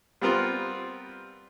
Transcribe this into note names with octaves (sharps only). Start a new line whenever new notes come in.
G3 B3 C4 F4 A#4